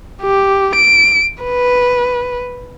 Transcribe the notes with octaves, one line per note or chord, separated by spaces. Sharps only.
G4
D7
B4